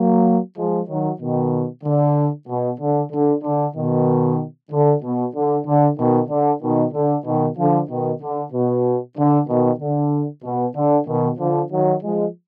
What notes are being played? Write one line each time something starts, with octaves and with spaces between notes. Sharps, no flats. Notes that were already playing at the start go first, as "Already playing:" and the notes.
Already playing: F#3 A#3
F3 G#3
D#3 F#3
B2 D#3
D3
B2
D3
D3
D3
B2 D#3
D3
B2
D3
D3
B2 D#3
D3
B2 D#3
D3
B2 D#3
D3 F3
B2 D#3
D3
B2
D3
B2 D#3
D3
B2
D3
B2 D#3
D3 F3
D#3 F#3
F3 G#3